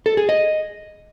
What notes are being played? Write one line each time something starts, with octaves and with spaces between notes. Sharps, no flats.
A4
G#4
D#5